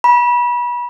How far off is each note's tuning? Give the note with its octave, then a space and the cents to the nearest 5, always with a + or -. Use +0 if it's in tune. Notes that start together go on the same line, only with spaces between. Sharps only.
B5 -30